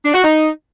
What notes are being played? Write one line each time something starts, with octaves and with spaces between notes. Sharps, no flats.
D4
F#4
D#4